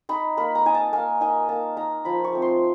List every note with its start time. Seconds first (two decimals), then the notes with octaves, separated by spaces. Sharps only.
0.09 D#4 B5
0.37 A#3 B5
0.55 A#5
0.66 D#4 G#5
0.75 A5
0.93 A#3 G#5
1.21 D#4 G#5
1.49 A#3 A5
1.77 D#4 A#5
2.05 F3 B5
2.24 C#6
2.33 A3 C4
2.42 C6